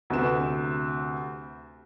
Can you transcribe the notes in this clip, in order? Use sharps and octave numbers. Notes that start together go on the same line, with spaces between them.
D2 C3 B4 E7